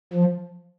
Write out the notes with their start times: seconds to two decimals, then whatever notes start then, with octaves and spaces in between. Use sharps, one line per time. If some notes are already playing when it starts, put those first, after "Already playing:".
0.13 F3